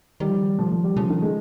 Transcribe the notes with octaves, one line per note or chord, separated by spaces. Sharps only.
D#3 G3
F3
D#3
F3
F3
G3
C#3 F3
D#3
G#3